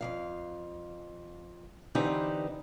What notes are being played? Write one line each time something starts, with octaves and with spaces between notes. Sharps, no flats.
F2 E3 F5
D3 E3 C4 D#4 G4 B4